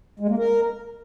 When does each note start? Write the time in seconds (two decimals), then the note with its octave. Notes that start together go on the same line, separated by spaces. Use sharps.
0.20 G#3
0.29 A#3
0.38 A#4